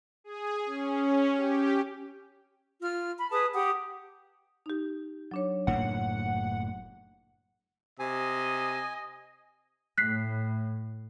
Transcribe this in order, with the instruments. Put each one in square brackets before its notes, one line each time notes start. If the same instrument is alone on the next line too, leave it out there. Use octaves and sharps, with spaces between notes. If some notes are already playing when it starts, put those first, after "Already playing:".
[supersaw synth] G#4
C#4
G4
[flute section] F4 F6
B5
G#4 B4 A5 D#6
G4 F#5 D#6
[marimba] D#4 G4
F#3 D4 C#5
[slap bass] F#1 A2 A#3 [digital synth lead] F#5
[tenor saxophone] C3 [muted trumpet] D#5 [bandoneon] G#5
[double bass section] A2 [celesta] F#6 B6 C7